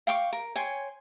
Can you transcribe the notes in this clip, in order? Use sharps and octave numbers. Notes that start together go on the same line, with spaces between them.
F5 G5 C#6 D6
A#4
C#5 G5 G#5 C6